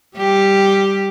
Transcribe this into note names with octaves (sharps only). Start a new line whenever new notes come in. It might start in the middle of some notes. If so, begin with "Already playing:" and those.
G3 G4